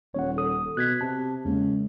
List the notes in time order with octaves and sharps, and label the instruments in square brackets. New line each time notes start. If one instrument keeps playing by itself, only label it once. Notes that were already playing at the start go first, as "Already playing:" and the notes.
[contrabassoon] D#1 [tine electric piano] C#5 F#5
[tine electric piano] A4 D#6
[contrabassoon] B2 [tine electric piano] F#6 G#6 B6
[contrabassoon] C3 [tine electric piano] A5
[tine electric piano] E2 G#3 A#3 [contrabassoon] C#3